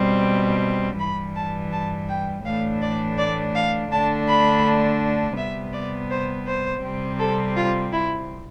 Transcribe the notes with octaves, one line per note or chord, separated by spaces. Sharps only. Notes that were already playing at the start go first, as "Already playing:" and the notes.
Already playing: B2 G3 C4
G2 E3 G3 B5
A5
A5
G5
A2 E3 A3 D4 F5
D5
D5
F5
D3 A3 D4 A5
B5
C3 G3 B3 E5
D5
C5
C5
C3 G3 C4
A4
F4
E4